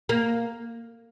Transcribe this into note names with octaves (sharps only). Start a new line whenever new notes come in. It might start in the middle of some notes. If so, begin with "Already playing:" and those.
A#3